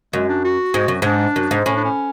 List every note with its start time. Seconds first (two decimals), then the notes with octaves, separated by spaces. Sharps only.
0.13 F#2 G#3
0.29 D4
0.44 F#4
0.74 G#2
0.88 F#2
1.02 G#2 D4
1.36 F#2
1.51 G#2
1.66 A2 C#4
1.76 D4
1.84 C#4